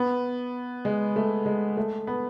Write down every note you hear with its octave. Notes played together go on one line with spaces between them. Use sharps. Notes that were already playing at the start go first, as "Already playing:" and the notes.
Already playing: B3
G#3
A3
G#3
A3
B3